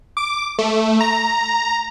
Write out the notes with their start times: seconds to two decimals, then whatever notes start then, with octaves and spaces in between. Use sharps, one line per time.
0.17 D6
0.59 A3
1.01 A#5